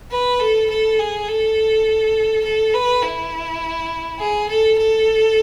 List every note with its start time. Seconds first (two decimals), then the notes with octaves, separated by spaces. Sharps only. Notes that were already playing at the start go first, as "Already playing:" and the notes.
0.11 B4
0.40 A4
0.69 A4
0.99 G#4
1.28 A4
2.44 A4
2.73 B4
3.03 E4
4.19 G#4
4.49 A4
4.78 A4